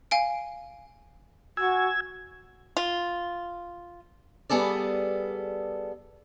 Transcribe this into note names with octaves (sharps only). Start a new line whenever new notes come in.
F5 G#5 D7
F#4 G#5 E6 G#6
F4
G3 B3 G#4 A4 D5